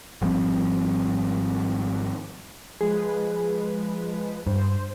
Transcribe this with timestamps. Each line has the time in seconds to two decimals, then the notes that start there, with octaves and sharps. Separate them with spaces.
0.22 G#1 F3 G3 C4
2.81 F3 G#3 G#4 B4
4.47 G2 C5